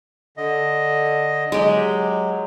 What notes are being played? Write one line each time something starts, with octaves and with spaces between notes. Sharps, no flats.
D3 D#5
F#3 G#3 G4